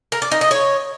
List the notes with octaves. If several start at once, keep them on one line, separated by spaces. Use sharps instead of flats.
A#4
D5
D#4
D#5
C#5